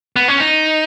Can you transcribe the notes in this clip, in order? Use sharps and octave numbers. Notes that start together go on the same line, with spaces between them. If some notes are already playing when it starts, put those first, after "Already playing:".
B3
C#4
D#4